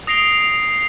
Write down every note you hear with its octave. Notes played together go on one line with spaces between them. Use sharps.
D#6 A#6 C7 D7 F7 G7